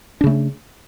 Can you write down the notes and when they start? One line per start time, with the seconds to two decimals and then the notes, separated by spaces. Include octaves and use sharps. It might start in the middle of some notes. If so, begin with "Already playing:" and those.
0.21 D4
0.24 C#3
0.27 A3